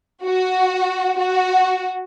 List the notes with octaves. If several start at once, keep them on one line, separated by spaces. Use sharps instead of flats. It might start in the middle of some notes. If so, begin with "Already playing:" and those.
F#4
F#4